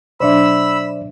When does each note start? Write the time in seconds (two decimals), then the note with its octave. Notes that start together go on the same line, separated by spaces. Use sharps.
0.20 B2 F#3 D4 C5 D5 E5 B5 E6